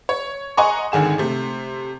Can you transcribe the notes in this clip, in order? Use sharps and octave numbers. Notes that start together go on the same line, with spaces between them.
C#5
D#5 F#5 G#5 A#5 C6 C#6
G#1 D3 D#3 G#4 E7
C3 A3